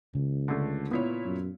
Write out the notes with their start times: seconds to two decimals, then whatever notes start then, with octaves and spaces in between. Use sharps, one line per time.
0.15 C#2 C#3
0.48 D3 A3
0.91 A#2 B3 E4 C#5
1.24 F#2